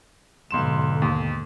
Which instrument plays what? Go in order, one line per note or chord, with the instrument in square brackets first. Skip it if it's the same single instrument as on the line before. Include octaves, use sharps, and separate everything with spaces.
[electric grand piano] B1 C6 E7 [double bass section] G#2 B2 D3
[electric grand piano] D#2